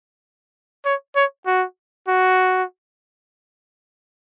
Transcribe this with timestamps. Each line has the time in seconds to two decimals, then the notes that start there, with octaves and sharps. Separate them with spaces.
0.85 C#5
1.15 C#5
1.46 F#4
2.08 F#4